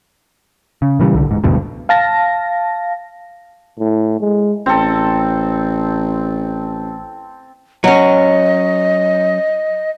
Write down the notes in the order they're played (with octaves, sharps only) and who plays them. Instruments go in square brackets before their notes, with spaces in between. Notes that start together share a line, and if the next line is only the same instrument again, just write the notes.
[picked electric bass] C#3
A#2 C#3 E3 G3
C2 D3
D1 G#2
F#1 D2 G2 B2
[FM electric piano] F5 A5 A#6
[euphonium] A2
G#3
[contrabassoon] A1 [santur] C4 A4
[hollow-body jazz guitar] F#3 C#4 [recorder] D#5